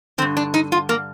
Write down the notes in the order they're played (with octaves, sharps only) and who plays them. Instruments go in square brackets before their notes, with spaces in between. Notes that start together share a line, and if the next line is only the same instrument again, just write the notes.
[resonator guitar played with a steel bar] D3 C4
G2
D4
D#4
F4
A#3